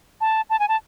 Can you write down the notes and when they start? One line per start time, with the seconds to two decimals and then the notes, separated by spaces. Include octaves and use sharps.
0.21 A5
0.50 A5
0.60 G#5
0.68 A5